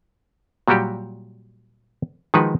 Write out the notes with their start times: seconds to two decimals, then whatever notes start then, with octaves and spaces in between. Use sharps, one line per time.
0.68 A#2 F#3 G3 F#4 G4
2.34 D#3 F3 G#3 D#4 F#4 B4